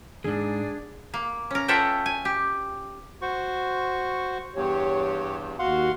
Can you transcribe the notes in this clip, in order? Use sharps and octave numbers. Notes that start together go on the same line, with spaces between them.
D#2 G#2 D4 G#4
A#3
C#4 A#4
F4 A4 C#5 E5 F#5 G5
G#5
G4
F#4 C5 C#6
E2 G2 G4 C#5
D#2 F#4 F5 F#5 C6